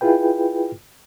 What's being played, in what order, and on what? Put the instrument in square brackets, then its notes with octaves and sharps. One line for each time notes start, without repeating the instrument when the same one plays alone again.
[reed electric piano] E4 F4 G#4 B4 G5